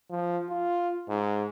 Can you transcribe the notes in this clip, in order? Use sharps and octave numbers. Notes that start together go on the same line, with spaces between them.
F3
F4
G#2